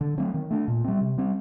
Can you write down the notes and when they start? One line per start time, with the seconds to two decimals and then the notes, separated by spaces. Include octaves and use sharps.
0.01 D3
0.18 F#3 A3 C4
0.34 D#3
0.51 A3 D4
0.68 A#2
0.84 G3 C4
1.01 C3
1.18 G3 C4